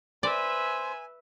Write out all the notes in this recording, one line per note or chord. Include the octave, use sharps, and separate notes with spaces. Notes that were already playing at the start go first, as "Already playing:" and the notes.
B4 C5 D5 E5 G#5